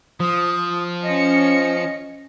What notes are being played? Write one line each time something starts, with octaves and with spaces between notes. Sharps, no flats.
F3 D#6
C#4 D#5 C#7